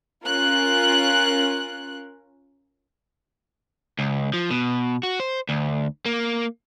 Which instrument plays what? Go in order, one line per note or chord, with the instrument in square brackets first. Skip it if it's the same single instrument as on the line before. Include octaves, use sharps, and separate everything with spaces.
[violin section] C#4 F4 A#4 F#6
[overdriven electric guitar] C#2
F3
B2
F#4
C5
D2
A#3